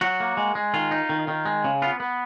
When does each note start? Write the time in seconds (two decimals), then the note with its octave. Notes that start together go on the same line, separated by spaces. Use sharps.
0.01 F#3 F#4
0.20 A#3
0.37 G#3
0.55 G#3
0.74 D#3 F4
0.91 D#4
1.09 D#3
1.28 D#3
1.45 G#3
1.64 C#3
1.82 B3 F4
2.00 B3